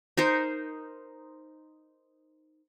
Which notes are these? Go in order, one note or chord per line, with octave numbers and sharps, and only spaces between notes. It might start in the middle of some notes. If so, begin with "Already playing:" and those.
D#4 A#4 C5